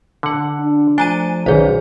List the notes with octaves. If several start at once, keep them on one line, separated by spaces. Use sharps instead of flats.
D3 F#5
D4
F3 A3 D4 G#5 A#5 D#7
B1 D#3 F#3 G#4 C5